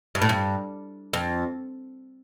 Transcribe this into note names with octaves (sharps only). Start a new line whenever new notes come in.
G2
A2
G2
F2